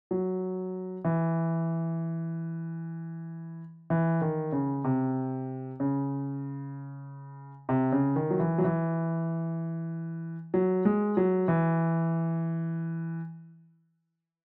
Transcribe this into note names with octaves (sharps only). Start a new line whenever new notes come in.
F#3
E3
E3
D#3
C#3
C3
C#3
C3
C#3
D#3
F#3
E3
F#3
E3
F#3
G#3
F#3
E3